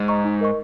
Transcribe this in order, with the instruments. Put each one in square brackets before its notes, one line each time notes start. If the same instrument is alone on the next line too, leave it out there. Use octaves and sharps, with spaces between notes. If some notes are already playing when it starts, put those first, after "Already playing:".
Already playing: [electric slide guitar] G#2
[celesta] D#5 A#5 C#6
D#4
A#4 D#5 C#6